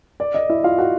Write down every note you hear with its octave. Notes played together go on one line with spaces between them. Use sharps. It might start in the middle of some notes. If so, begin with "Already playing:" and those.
D5
D#5
E4 E5
F4 F5
F#4 F#5